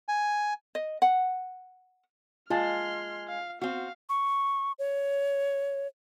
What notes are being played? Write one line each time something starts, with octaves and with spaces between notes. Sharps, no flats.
G#5
D#5
F#5
G#3 F4 A5 C6 F6
F5
C4 F#4 F5
C#6
C#5